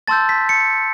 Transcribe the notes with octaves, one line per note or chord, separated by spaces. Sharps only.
A5 C6 E6 G6 A6
B6
C#7